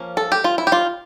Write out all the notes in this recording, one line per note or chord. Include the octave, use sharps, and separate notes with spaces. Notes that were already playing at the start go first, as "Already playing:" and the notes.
Already playing: F3 A#3 C#4
A4
G4
F4
E4
G4
F4